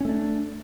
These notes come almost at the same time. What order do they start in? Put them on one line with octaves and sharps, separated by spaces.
C#4 A3 D4